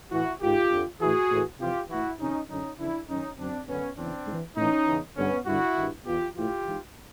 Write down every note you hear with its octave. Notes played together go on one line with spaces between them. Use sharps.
A2 E3 E4 F#4
G#2 D#3 F4 G4
F2 D3
A2 E3 F#4 G#4
A2 E3
F2 C3 E3 F4 G4
A2 E3 E4 F#4
F2 C3 D#3 C#4 D#4
F#2 D3 C#4 D#4
F2 C#3 E3 D4 E4
F#2 D#3 C#4 D#4
F#2 D3 C4 D4
F#2 D3 B3 C#4
E2 C#3 E3 C4 D4
G#2
E3
A2 E3 C#4 D#4
E2 C#3 E3
G2 D3 B3 C#4
G2 D3 E4 F#4
G2 D#3
E2 B2 F4 G4
A2 E3 F4 G4
G#2 E3